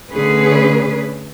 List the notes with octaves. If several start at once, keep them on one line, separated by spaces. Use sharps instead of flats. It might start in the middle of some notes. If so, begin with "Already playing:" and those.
D3 A3 C#4 G#4 B4